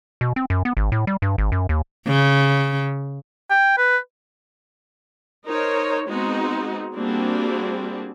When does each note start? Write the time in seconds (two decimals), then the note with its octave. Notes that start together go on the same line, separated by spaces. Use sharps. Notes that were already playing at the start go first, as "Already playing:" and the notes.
0.21 B2
0.36 C4
0.50 F#2
0.65 B3
0.77 G#1
0.92 A2
1.07 G3
1.22 G2
1.38 G#1
1.52 F#2
1.69 D#2
2.07 C#3
3.50 G5
3.78 B4
5.46 D#4 A#4 C5 C#5
6.08 G#3 B3 C4 D#4 F#4
6.95 G3 A#3 C4 D4 F#4 G#4